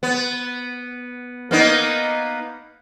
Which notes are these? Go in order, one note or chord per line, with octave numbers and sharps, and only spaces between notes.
B3
A#3 B3 D#4